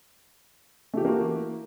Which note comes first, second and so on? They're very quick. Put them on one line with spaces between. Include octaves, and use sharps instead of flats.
A3 G4 E3 A#3 F#4